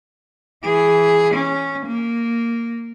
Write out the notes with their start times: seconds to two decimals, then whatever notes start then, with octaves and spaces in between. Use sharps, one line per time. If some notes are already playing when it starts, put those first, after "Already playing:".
0.65 E3 G#4
1.35 C#4
1.86 A#3